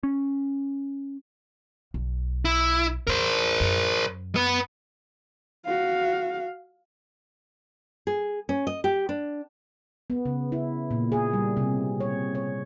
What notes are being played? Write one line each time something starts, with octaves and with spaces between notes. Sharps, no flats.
C#4
B1
E4
E2 A#4 C5
F#2
B3 B4
F#4 F5
G#4
C#4
D#5
G4
D4
B3
C#3
E4
A#2
G#4
G3
C3
C#5
C#5